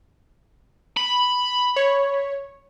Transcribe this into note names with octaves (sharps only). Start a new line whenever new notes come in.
B5
C#5